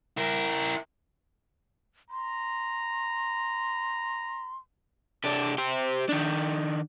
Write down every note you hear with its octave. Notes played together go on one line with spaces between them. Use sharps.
E4 A#4
A#5 C6
C3 D4
G4 C5
D#3 D4